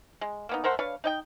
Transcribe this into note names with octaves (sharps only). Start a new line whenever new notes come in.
G#3
A#3 B3 D#4
A3 A#4 C5 F#5
D4 B4 C#5 F5
D#4 D#5 G5